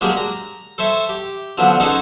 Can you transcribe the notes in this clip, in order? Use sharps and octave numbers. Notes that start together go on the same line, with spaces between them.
F#3 G#3 A#3 D4 G4 G#4
A#5
A4 C5 C#5 E5
G4
D3 F3 F#3 B3 D4
C#4 D#4 F#4 G#4 A4 C5